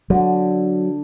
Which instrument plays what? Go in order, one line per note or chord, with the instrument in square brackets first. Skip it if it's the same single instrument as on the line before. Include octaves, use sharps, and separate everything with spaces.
[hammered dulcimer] D3 [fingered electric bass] F#3